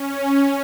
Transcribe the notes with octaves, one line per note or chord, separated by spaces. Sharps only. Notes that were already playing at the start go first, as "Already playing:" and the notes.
Already playing: C#4